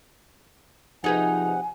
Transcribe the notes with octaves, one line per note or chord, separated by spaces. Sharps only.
C3 F3 D#4 G#4 B4 F#5 G#5